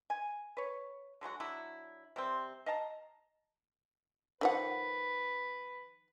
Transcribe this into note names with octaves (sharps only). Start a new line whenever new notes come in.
G#5
B4 C#5
D3 F#3 G#3 F#4
F#3 D4 E4
C3 G3 C4
D#5 F5 A5 A#5
D#3 F3 B4 F#5